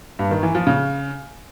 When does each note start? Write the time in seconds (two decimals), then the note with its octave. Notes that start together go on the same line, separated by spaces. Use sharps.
0.19 G2
0.31 D#3
0.43 E3
0.55 F3
0.67 C#3